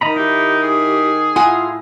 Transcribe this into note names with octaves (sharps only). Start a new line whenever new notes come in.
D#3 D#5 A#5 B5
D#4 E4 G4
G#4
A2 F4 F#5 G#5